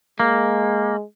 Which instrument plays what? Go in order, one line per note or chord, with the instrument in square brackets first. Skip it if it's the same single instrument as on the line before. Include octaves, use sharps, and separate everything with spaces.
[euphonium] G#3 [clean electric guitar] A#3